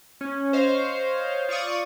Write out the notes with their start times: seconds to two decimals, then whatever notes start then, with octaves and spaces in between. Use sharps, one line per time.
0.21 C#4
0.53 C5 C#5 D#5 F5
1.49 F4 D5 C#6 D#6